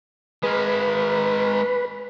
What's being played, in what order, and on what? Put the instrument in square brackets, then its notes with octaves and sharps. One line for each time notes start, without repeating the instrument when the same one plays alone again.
[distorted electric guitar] G#3 A#4 [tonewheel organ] B4